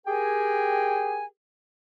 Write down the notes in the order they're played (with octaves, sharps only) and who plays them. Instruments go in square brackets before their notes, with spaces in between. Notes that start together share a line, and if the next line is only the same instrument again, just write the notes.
[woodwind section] G4 G#4 A#4 G5 G#5